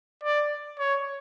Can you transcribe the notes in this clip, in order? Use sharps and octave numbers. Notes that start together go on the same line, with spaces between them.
D5
C#5